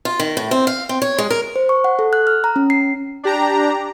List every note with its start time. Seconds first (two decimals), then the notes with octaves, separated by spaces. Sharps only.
0.05 F4
0.20 D#3
0.37 A2
0.51 C4
0.67 F5
0.89 C4
1.02 C#5
1.19 G#3
1.30 A#4
1.56 C5
1.69 C#6
1.84 F#5
1.99 A4
2.13 F#6
2.27 F6
2.44 A#5
2.56 C#4
2.70 C7
3.23 D4 G4 A#5